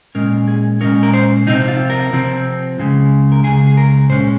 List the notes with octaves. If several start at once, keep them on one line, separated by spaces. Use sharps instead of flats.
A#2 G#3 C#4 A#4
G#4
A#2 G#3 C#4 A#4
A#4
C5
C3 F3 C4 D#4
F4
A#4
C3 F3 C4
C#2 C#3 G#3
A#4
C#2 C#3 G#3 G#4
G#4
A#4
A#2 G#3 C#4 C5